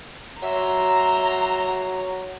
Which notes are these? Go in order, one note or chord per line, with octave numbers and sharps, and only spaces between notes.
F#3 E5 A#5 C6